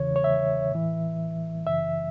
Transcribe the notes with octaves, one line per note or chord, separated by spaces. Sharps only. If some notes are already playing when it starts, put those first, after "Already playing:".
Already playing: E2 C#3 E3 C#5
C#5
E5
A2 E3
F#2 C#3 E3 E5